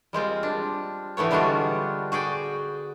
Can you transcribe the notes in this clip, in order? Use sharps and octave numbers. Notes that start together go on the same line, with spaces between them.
G3 G#3 C4 F4
D4
A2 E3 A3 B3 C#5
D3 G3 G#3 D4 F4 F#4
F#4 G#4 D5 G5